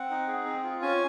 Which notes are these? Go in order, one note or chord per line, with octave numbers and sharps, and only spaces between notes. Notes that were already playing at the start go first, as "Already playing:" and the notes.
Already playing: C4 F#5
D#4
G#4
C4
F4
C#4 G#5